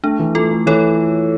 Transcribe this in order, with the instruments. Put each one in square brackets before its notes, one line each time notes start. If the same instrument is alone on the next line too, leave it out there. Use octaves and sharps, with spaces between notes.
[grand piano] A3 [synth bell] D4
[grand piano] E3
[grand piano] A3 [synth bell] F4 A4
[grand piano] A3
[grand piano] E3 [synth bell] A4 C#5